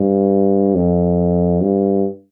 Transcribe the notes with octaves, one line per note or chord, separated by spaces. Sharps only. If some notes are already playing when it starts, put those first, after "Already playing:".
Already playing: G2
F2
G2